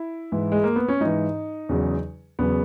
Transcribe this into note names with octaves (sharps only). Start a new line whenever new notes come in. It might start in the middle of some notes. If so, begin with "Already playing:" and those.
Already playing: E4
G#2 E3
G#3
A#3
B3
C#4
G#2 E3 D#4
E2 C#3 F#3
E2 C#3 F#3 B3